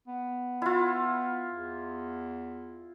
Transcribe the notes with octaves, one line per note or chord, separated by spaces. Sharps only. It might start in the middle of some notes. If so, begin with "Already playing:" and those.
B3
E4 F4
E2